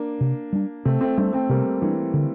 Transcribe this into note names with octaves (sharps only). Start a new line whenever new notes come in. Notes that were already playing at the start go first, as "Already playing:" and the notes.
Already playing: A#3 D4
C3
G3 D4
C3 A3 C4
A3 C4
G3 A3 C4 D4
A3 C4
C3 G3 A#3
E3 G3 D4
D3